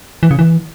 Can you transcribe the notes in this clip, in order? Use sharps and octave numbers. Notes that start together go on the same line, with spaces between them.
E3
C#3
E3